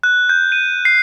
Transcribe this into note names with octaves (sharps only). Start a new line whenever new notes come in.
F#6
G6
D#7
C7